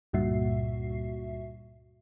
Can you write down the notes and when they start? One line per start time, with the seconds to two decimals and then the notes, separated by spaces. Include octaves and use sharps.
0.13 C#2 G2 A#2 F#4 E5 C7